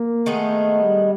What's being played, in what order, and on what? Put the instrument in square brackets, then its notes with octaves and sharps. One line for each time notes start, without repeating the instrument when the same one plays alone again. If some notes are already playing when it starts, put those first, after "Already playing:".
Already playing: [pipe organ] A#3
[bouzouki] D#3 G#3 B3 D#4 [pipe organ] A3
[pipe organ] G3